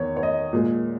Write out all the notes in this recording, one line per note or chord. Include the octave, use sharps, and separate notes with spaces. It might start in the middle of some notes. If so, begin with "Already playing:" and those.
Already playing: E2 D#3 C#5
C#5
D#5
A#2 G#3